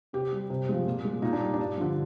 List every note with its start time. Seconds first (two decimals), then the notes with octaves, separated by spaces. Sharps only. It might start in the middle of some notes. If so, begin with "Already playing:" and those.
0.13 C3 G4
0.32 G3
0.50 C3
0.69 F3 G#3
0.86 A#2
1.05 G#3
1.22 A#2 D#4
1.33 D4
1.41 G3
1.54 D4
1.59 G2
1.78 D3 F3